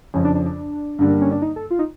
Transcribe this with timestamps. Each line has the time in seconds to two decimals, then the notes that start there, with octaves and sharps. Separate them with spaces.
0.14 F2 C#3 F3 C#4
0.24 D4
0.35 D4
0.46 D4
0.99 G2 D3 G3 A#3
1.21 C#4
1.31 D4
1.42 D#4
1.56 A4
1.70 F4
1.79 D#4